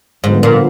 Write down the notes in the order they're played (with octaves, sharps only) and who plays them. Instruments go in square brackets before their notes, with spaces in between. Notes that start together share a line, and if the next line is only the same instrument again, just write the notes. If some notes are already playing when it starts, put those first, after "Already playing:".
[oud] G#2 [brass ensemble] D3 F3 B3
[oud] A#2